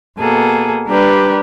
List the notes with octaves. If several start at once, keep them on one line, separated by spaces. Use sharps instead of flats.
B2 A#3 G#4 A4
G3 D4 G4 A#4 B4